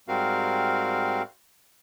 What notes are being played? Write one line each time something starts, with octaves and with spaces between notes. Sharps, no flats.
G#2 G3 C4 F#4 A#4 F5